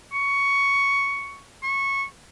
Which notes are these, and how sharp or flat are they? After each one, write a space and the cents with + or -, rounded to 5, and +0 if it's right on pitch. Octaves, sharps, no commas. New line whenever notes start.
C#6 +10
C#6 -15